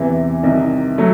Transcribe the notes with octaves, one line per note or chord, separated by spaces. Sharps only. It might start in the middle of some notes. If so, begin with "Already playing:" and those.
Already playing: E2 C3 E3
C2 C3 D#3
F#3 A3